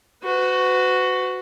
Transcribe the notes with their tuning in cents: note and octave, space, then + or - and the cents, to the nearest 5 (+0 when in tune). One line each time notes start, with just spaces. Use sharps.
F#4 +0 B4 +40